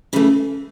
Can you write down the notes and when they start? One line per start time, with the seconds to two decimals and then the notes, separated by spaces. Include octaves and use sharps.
0.13 C#3 E3 A3